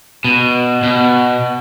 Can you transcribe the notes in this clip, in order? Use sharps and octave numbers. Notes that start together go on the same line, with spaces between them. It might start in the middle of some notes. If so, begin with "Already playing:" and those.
B2
B2